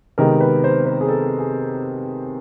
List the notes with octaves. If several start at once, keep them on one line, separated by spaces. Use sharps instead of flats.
C3 D#3 G#3 B3 A#4
B4
C5
B4
G#4
A4
G#4